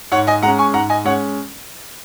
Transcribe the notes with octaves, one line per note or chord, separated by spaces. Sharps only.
G#2 C#5 F#5
D#5 G#5
G#3 C#4 F#5 A#5
G#5 C#6
G#2 F#5 A#5
D#5 G#5
G#3 C#4 C#5 F#5